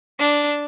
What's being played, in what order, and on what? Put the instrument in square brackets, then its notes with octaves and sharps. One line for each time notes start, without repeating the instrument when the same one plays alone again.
[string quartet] D4